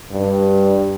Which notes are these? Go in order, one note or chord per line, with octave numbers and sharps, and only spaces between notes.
G2